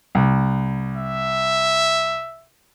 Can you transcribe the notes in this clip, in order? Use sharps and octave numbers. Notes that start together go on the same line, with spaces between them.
C2
E5